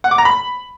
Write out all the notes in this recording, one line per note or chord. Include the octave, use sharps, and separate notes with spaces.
F#5
D6
A#5
B5